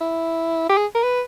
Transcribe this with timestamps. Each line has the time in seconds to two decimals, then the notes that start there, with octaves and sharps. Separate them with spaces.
0.01 E4
0.69 G4
0.77 G#4
0.95 A#4
1.03 B4